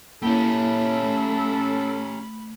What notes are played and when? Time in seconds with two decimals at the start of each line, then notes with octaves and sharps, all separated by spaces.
0.22 A#3 C#4 E4 G4 A4 B5
1.03 A3